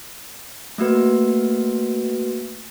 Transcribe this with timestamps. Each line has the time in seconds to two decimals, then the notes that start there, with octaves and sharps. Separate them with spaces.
0.78 A3 A#3 F#4 B4